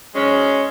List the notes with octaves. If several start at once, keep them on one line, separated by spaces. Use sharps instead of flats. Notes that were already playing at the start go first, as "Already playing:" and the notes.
G#2 F#3 G#3 C#4